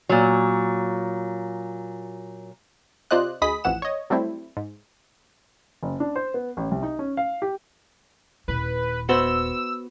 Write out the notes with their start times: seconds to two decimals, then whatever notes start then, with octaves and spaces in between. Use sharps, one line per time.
0.09 A#2 F#3
3.11 C3 F4 C5 D5 D#5 F#6
3.42 D2 G#4 D#5 B5 D#6 B6
3.64 A1 F2 E3 F#5 E7
3.82 C#5 D#5
4.10 F#3 G3 A3 C4 E4
4.57 G#2
5.83 F#1
6.00 D4
6.16 C5
6.34 B3
6.57 A1
6.71 C2
6.83 D#4
6.99 C#4
7.17 F5
7.42 G4
8.48 D#1 E4 B4
9.09 B3 F#4 C5 E6